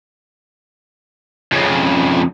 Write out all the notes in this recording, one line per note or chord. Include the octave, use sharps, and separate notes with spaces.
F2 C#3